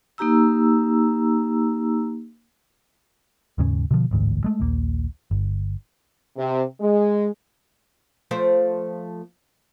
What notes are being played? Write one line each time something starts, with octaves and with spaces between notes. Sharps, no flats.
A#3 D#4 G4 A#5 E6
D#2 G#2 C#3 C#4
B2 D3 F3
A1 D2 G#2
G#3 A3
A#1 D#2 A#3
G1
C3
G#3
F3 A3 C5